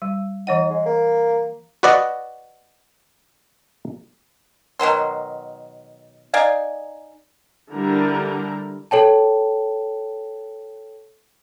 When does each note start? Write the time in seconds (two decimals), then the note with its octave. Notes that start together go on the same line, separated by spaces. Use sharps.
0.02 G3
0.47 E3 D#4 C#5 F#5
0.70 G#3
0.86 A#3
1.83 F#4 B4 D5 D#5 F#5
4.79 B2 D#3 F#3 C6
6.34 D#4 D5 F5 G#5
7.71 D3 G3 E4 A#4 A#5
8.91 A4 C#5 G5 A5